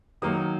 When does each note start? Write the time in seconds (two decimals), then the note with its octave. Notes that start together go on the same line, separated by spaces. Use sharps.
0.22 D#3 F#3 A#3 D#4 D#6